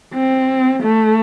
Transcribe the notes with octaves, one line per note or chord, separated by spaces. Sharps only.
C4
A3